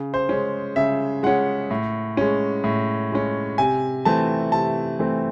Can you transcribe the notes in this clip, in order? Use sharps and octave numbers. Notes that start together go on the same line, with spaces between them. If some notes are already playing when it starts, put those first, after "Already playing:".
Already playing: C#3
C5
G#3 C#4
C#3 E5
G#3 C#4 F#5
A2
G#3 C#4
A2
G#3 C#4
C3 G#5
E3 A3 C4 A5
C3 A5
E3 A3 C4